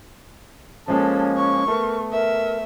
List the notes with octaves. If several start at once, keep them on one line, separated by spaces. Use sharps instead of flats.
F3 G#3 A#3 C#4 A4
C#6
A3 B3 A#4
A#4 E5